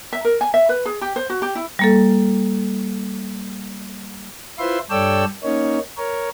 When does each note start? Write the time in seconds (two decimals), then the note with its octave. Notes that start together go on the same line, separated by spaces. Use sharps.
0.13 E5
0.25 A#4
0.41 G#5
0.54 E5
0.69 B4
0.86 G#4
1.01 G4
1.16 C5
1.30 F#4
1.42 G4
1.55 E4
1.79 G3 A#3 A4
4.59 E4 F4 B4 C5 E5 C6
4.90 G2 A4 C#5 D5 G5 E6
5.44 A#3 C#4 D#4 C#5
5.97 A#4 C#5